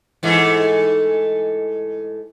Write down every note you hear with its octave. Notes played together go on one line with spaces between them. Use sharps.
G#2 E3 A3